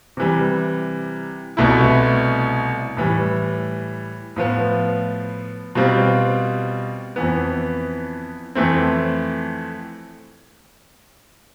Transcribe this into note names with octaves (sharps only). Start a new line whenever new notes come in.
C3 E3 G3
C2 B2 A3 E4
A2 E3 G3
A2 F3 B3
B2 G3 C4 F4
F2 E3 B3
F2 E3 A3 C4